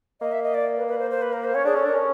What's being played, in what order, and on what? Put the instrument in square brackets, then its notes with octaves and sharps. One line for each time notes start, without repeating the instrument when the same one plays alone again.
[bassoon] A#3 [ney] D#5
[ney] E5
D#5
D5
B4
B4
C5
C5
B4
A#4
C5
[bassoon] C#4 [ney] C#5
[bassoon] D4 [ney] G#4
[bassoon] C#4 [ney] A4
[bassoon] D4 [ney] A#4
[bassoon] C#4